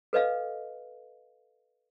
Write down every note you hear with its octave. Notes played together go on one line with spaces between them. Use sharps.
A4 B4 D#5 F5